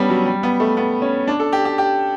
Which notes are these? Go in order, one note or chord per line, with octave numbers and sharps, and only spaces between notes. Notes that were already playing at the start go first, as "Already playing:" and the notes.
Already playing: G3 B3 C#4 D4
F#3
G3
B3
A3
B3
C#4
D4
A4
G4
G4
G4